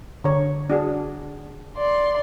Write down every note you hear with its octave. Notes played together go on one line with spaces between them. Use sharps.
D3 C#5
D4 F#4 G#4
D5 C6